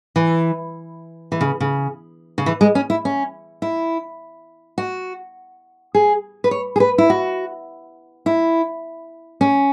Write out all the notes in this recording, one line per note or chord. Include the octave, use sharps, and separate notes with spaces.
E3
E3
C#3
C#3
C#3
E3
G#3
C#4
E4
C#4
E4
F#4
G#4
B4
C#5
G#4
B4
E4
F#4
E4
C#4